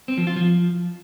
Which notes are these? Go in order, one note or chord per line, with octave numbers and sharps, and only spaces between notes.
C4
F3
F4
F3